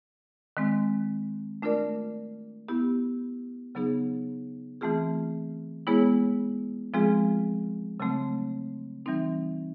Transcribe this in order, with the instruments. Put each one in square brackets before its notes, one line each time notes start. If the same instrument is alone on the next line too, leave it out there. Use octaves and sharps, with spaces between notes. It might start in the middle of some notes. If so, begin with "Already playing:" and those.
[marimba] D#3 G#3 C4
A3 D4 F4 A#4 D5
B3 E4 G4
C#3 F#3 B3 D#4 G#4
E3 A3 C4 F4 G#4
G#3 B3 E4 G#4 C#5
F3 G#3 C4 F4 G#4
C#3 F#3 A3 C4
E3 G3 C4 D#4